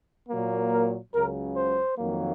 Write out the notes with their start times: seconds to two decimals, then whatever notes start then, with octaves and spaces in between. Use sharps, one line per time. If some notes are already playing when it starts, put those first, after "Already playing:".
0.29 A#2 F#3 A#3
0.72 A#4
1.13 C#2 C#3 F#3 A#4
1.56 C5
1.98 F2 D#3 F#3 A#3